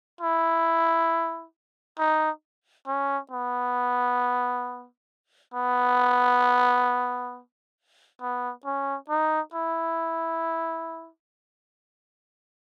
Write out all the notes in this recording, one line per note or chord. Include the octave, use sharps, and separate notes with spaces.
E4
D#4
C#4
B3
B3
B3
C#4
D#4
E4